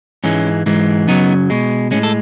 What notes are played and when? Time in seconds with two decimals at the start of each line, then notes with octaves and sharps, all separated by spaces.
0.24 G#2 E3 G#3 C#4
0.66 G#2 E3 G#3
1.07 F#2 C#3 F#3 B3 D#4
1.50 B2 G#3
1.91 A2 G#3 C#4
2.03 A4